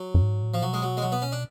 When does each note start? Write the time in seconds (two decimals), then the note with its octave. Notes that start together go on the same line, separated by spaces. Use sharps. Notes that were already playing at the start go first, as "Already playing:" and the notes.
Already playing: F#3
0.14 F#2
0.22 G#2
0.43 A2
0.54 F3
0.62 B2 F#3
0.73 G#3
0.82 F#3
0.97 G#3
1.02 F#3
1.12 B3
1.22 C#4
1.32 D4